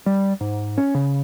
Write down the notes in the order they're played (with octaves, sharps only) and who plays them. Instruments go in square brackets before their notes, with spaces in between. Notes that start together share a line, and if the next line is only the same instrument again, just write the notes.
[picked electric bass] G3
G#2
C#4
C#3